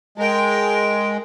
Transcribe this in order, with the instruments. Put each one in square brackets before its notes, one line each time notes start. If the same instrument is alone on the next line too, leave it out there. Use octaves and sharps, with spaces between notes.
[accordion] G#3 [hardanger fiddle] A#4 G5